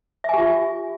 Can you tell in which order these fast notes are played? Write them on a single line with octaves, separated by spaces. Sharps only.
E5 G#5 G4 F4